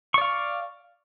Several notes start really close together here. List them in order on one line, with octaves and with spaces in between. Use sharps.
C#6 D5 F5